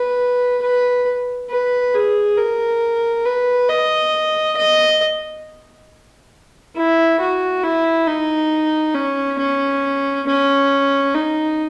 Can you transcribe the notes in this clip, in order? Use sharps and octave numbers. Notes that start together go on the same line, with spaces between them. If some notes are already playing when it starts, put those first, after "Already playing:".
Already playing: B4
B4
B4
G#4
A#4
B4
D#5
D#5
E4
F#4
E4
D#4
C#4
C#4
C#4
D#4